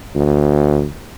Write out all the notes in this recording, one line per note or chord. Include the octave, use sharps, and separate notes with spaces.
D2